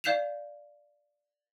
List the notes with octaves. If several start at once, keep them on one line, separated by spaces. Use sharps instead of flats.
D5 F5 G6 C7 E7 F7